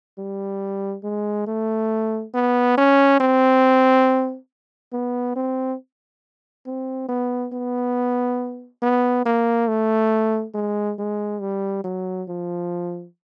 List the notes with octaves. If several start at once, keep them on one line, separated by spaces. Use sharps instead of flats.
G3
G#3
A3
B3
C#4
C4
B3
C4
C4
B3
B3
B3
A#3
A3
G#3
G#3
G3
F#3
F3